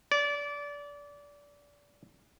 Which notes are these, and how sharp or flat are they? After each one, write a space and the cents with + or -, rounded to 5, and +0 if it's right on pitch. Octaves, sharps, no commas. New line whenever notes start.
D5 -25